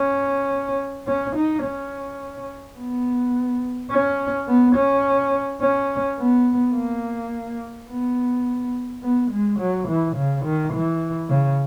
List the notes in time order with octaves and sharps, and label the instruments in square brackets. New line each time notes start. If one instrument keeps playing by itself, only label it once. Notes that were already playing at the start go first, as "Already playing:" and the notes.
Already playing: [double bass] C#4
C#4
D#4
C#4
B3
C#4
B3
C#4
C#4
B3
A#3
B3
B3
G#3
F#3
E3
C#3
D#3
E3
C#3